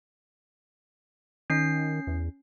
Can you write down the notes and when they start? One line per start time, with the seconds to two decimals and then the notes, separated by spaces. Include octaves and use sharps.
1.50 D#3 C#4 C7
2.07 E2